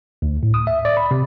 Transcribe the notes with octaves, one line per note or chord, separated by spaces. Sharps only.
D2
A2
D#6
E5
D5
B5
C3